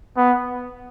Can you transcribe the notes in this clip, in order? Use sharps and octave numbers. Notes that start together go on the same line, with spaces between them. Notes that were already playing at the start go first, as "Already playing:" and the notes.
B3